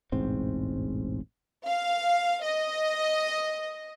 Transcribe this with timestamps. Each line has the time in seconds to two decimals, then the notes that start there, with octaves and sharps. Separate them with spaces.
0.12 E1 A1 G#2 C4
1.67 F5
2.44 D#5